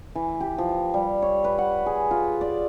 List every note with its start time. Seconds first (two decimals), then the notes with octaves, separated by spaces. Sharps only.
0.15 E3
0.41 G4
0.58 F3
0.94 G3
1.22 C#5
1.44 B4
1.58 F#5
1.86 G#4
2.11 F4
2.41 D5